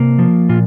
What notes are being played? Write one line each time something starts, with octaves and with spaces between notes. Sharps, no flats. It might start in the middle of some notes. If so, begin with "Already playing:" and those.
Already playing: C3 A#3
F3
A#2 F4